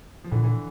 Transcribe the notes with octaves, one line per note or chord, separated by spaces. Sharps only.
F3
A#2 D3 E3
D3 E3